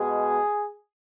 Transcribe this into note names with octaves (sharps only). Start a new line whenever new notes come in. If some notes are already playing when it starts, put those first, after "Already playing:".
Already playing: B2 G#3 G#4